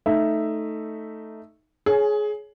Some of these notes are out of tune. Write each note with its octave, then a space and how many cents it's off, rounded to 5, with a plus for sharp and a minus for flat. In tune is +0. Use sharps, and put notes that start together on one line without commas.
A3 +0 D#4 +0 E5 +0
G#4 +20 C#5 +0 G#5 +0